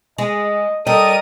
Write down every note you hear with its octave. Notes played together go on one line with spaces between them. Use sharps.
G#3 D#5
G3 A4 A#4 D#5 D#7